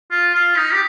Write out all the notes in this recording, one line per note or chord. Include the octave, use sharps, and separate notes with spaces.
F4
F4
D#4
G4